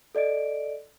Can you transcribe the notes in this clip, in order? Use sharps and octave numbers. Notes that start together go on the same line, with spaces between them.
A4 D5 D#5 D7